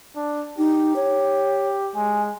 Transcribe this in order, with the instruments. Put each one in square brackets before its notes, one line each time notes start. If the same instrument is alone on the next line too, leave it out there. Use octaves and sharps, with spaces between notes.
[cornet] D4
[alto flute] D#4 [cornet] G4
[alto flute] C#5
[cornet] G#3 [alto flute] G#5